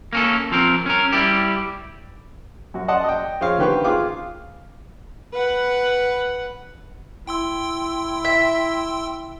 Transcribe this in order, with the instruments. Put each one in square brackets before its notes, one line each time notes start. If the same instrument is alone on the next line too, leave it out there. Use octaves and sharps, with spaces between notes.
[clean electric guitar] A#3 C#4 A4
F3 C4 A#4
C#4 A#4
G3 E4 G4
[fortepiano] F#2 F#4
D5 D#5 F#5 A5 C6 D#6
D#5 G5
F3 F4 G#4 C#5 F5
D3 D#3 G4 B4 C5 C#6
F4 G#4 F5 D6
[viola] B4 F#5
[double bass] E4 [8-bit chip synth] G5 C6 E6
[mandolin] E5